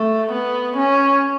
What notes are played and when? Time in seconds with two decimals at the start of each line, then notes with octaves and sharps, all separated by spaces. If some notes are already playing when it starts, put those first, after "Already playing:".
Already playing: A3
0.32 B3
0.77 C#4